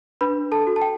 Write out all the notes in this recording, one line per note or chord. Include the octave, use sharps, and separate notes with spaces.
D4 B4 B5
A4 A5
F#4 A4
A5
G5